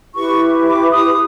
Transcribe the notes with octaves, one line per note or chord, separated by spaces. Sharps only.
E4 G4 B4 C#6
D6
D#6